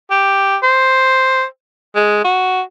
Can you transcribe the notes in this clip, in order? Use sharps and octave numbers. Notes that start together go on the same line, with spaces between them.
G4
C5
G#3
F#4